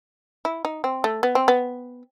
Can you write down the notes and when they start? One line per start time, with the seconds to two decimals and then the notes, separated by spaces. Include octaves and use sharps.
0.45 E4
0.65 D#4
0.84 C4
1.04 A3
1.23 B3
1.35 C4
1.48 B3